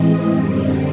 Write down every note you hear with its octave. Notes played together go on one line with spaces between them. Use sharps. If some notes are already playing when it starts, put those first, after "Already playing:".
Already playing: A2 E3 G#3 C4 D#5
F#2 D3 G3 C4